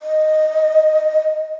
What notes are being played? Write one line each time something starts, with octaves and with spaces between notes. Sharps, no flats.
D#5